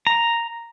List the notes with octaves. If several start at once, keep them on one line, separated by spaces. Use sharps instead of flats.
A#5